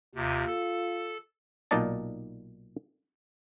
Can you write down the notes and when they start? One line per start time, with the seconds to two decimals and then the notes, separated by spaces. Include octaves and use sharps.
0.15 D#2 C3 F4
0.47 A4
1.71 B1 A#2 D#4 D5 D#5 A5